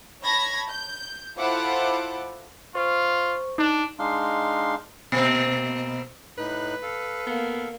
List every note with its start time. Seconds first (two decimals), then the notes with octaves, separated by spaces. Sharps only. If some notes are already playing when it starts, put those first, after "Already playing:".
0.23 C#5 A5 B5 G#6 A#6
0.69 G6
1.38 E4 F4 A4 C5 F#5 D6
2.75 F4 C5 C#6
3.58 D4 D#4
3.99 G#3 D4 D#4 F5 C6
5.12 B2 A#3 C4
6.38 A2 D#4 B4 F#6
6.82 A4 F5
7.27 A#3 B3